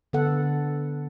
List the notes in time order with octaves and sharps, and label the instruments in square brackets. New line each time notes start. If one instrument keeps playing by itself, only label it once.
[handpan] D3 B3 A4 F#5